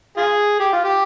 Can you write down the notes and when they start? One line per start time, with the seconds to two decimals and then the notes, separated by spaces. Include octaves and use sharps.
0.17 F4 G#4
0.60 G4
0.73 F4
0.84 G4